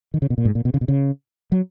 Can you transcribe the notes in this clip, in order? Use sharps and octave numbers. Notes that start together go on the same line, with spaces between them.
D#3
C#3
B2
A#2
G#2
A#2
B2
C#3
B2
C#3
F#3